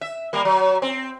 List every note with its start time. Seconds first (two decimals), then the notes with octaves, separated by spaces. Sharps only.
0.01 E5
0.33 G3 A#3
0.45 F#3
0.82 C4